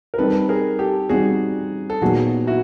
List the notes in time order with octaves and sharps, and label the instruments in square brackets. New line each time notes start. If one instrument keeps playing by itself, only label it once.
[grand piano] A#4
[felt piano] G3 C4 D#4 [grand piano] A4 B4
[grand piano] G#4 A#4
G4 A4
[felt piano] G3 C4 D#4 [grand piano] F#4 G#4
[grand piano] A4
[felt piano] A#2 F#3 B3 D#4 [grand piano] F#4 G#4
[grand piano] E4 F#4